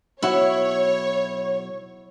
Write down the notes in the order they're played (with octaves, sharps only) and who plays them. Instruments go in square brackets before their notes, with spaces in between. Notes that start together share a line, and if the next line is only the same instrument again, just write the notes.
[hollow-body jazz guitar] B1 F#4 [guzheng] E4 [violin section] C#5